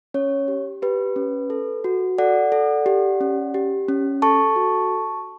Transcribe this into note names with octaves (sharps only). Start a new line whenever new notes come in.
C#4 C#5
G4
G4 B4
C#4
A4
F#4
A4 D5 F#5
A4
G4
C#4
G4
C#4
A4 A5 C#6
F#4